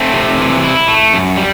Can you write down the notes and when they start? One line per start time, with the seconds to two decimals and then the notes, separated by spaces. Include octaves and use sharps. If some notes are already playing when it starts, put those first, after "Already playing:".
Already playing: A3 C4
0.13 C3
0.39 E3
0.63 E4
0.88 A3
1.13 F#2
1.37 G3